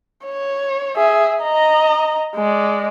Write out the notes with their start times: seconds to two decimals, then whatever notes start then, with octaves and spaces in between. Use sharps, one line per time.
0.25 C#5
0.97 G#4 E5
1.42 D#5 A#5
2.36 G#3 D5